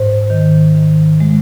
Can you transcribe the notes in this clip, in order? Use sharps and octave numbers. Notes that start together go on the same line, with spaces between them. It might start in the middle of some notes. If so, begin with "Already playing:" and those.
Already playing: G#2 C5
D#3
D#3
G#3